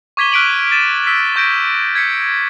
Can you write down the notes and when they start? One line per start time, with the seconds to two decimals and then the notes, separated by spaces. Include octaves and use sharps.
0.17 C#6 D6 G#6 B6 D#7 G7
0.32 F6 F#6 B6 D7 D#7 F#7
0.72 A6 D#7 E7
1.07 E6 B6
1.36 C#6 G6 A#6 D7
1.95 G#6 B6 C#7